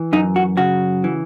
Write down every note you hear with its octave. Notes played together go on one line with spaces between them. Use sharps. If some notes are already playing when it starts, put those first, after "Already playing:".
Already playing: E3
F#2 D#4
F#4
C#3 F#4
E3